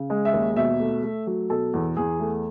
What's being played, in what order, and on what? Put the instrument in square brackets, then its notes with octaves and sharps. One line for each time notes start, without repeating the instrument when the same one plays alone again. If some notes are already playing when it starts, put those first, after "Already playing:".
Already playing: [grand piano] C#3
G#3
E5
D#2
B2 E5
A3
A3
F#3
B2 A4
E2
E2 G#4
A3